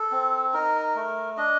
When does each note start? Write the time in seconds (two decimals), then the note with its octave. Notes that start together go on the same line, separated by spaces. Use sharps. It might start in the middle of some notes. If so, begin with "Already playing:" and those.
Already playing: A4
0.12 C4
0.54 D#4 A#4
0.96 A3
1.37 D4 D#5